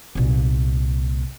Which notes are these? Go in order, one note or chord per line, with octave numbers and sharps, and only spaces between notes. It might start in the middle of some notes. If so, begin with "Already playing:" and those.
C2 A#2